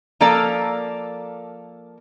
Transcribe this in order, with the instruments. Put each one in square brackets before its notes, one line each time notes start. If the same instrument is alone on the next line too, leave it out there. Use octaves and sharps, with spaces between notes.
[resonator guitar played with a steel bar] F3 A#3 A4 A#4 D5